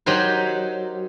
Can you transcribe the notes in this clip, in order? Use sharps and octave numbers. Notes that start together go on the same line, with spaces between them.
F#3 D#4 G4 A#4 C5